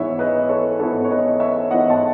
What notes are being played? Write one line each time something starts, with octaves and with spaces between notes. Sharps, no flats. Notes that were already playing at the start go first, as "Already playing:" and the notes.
Already playing: G#2 E3 B3 E4 C#5 E5
B4 D#5
A4 C#5
G#2 E3 B3 E4 A4 C#5
C#5
B4 D#5
C#5 E5
G#2 E3 B3 E4 D#5 F#5
A5